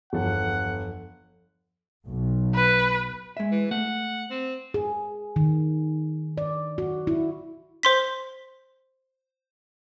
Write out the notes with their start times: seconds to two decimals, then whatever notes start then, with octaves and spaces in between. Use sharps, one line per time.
0.13 G1 E2 F3 A4 F#5
2.07 B1
2.55 B4
3.37 G#3 E5
3.52 E3
3.71 A3 F#5
4.31 C4
4.74 G#4
5.36 D#3
6.38 D5
6.78 F#4
7.07 E4
7.83 C5 C6 B6